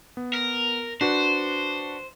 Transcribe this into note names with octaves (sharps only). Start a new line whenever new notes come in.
B3
A#4
D4 F#4 B4 C5